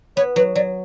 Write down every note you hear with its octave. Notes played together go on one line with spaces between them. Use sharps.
B3 C#5
F#3 B4
F#3 D5